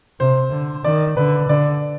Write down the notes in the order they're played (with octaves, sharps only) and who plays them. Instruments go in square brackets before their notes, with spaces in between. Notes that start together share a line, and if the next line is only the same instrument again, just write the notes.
[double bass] C3 [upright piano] C5
[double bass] D3
[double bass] D#3 [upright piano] D5
[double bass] D3 [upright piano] B4
[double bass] D3 [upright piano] D5